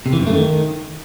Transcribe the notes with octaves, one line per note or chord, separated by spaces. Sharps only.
C3
E3
F#2
A3
D#3